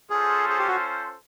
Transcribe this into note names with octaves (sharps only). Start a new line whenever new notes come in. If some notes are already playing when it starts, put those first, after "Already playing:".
C#4 F4 G#4 A4 C5
G#4
G4
F#4